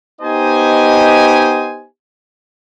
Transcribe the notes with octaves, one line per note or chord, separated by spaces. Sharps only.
B3 D#4 G4 C5 D#5 G#5